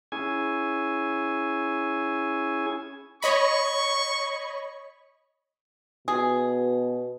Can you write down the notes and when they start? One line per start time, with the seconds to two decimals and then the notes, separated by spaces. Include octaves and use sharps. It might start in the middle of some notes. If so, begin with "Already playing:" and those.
0.12 C#4 E4 G#4 G#5
3.23 C#5 D#5 B5 C#6
6.08 B2 G#4